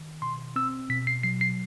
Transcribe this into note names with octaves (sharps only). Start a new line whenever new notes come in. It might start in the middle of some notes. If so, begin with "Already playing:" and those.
Already playing: D#3
B2 C6
C4 E6
B2 B6
C7
F#3 C7
C7